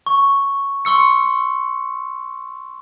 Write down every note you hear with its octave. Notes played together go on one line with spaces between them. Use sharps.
C#6
C6 C#6 E6 C#7